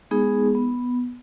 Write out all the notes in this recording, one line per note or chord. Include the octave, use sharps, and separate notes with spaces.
G#3 B3 D#4 G#4
B3